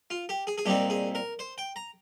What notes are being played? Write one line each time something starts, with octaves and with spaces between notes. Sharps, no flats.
F4
G4
G#4
G#4
C2 A#2 G3 C4 D#4 G4
G#4
A#4
C5
G5
A#5